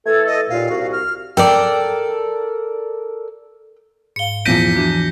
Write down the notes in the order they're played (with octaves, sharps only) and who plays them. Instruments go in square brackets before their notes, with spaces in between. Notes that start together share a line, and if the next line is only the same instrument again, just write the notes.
[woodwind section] E3 A3 A4 [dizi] G#6
[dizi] D#5
[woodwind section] D#2 A#2 [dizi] F5
[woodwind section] C2 F#4
[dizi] F6
[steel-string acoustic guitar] A4 A#4 D5 [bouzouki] G5
[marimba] G#2 F5 [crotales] C#7 G7
[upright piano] E2 F3 D#7 [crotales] G6 A#6 B6
[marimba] E3 D4 F#4